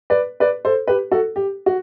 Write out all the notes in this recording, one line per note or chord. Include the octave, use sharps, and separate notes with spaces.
B4 D5
B4 D5
A4 C5
G4 B4
F#4 A4
G4
F#4